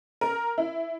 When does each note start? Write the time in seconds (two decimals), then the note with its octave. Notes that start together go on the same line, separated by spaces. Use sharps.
0.21 A#4
0.58 E4